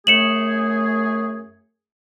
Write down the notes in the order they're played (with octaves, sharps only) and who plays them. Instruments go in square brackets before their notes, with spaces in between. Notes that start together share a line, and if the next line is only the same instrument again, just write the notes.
[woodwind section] F#2 A3 G#4 [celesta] C#7 E7 F#7